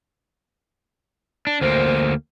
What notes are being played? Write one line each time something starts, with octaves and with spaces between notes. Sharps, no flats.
D4
D2 A#3 C5